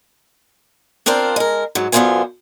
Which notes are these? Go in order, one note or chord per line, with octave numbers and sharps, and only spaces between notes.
C4 D4 F4 A#4 C5
G#3 A#4
G#2 F#3
F#2 D3 B3 F4 C5 G#5